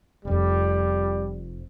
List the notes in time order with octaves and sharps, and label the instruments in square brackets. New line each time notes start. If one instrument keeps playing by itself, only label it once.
[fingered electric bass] F1 F2 [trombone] G3